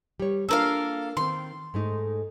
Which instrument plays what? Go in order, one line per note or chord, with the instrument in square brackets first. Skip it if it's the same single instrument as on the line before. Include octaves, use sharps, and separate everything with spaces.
[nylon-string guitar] G3 C#5
[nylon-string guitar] A#3 D4 F4 [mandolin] A4 A#4 F5
[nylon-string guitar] D#3 C4 [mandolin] C6
[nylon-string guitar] G#2 A3 D#4